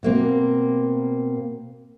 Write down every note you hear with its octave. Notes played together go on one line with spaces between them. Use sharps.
B2 A#3 C4